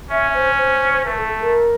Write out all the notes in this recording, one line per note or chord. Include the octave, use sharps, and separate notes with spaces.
C#4 E5
C5
C5
C5
A3 B4
A#4
A4
A4
A#4